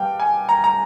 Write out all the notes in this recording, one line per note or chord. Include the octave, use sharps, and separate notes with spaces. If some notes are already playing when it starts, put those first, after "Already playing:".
Already playing: G2 F5 G5
G#5
A#5
A#5